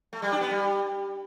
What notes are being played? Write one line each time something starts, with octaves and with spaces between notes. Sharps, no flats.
A3
G3
D4
B3
G3